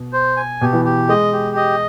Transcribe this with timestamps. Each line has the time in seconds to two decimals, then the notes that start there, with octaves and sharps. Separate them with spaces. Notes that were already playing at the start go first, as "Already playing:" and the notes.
Already playing: B2
0.13 C5
0.37 G#5
0.61 B2 G4
0.73 E3
0.85 G4
1.09 G#3 D#5
1.33 G4
1.56 D#5